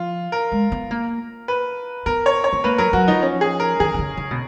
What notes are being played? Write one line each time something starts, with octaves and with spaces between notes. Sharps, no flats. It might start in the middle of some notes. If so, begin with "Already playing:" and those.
Already playing: F3 F4
A#4
G#3
B3
A#3
B4
B3 A#4
C#5
C#5
B3
A#3 B4
F#3 A#4
F#3 F#4
F3 D#4
C#4
G#4
A#4
D#3 G#4
D#3
C#3
C#3
B2